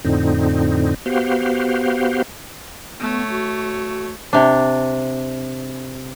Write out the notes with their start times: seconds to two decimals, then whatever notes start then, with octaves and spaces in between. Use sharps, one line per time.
0.05 F2 A2 D3 C4 D#4
1.06 B3 F#4 G4 C5 F5
3.00 A3 B3 C#5
3.30 F#4
4.33 C3 D4